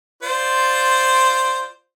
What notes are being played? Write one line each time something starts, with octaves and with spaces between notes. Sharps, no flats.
F4 C5 D5